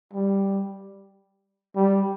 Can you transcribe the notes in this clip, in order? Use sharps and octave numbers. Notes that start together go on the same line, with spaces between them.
G3
G3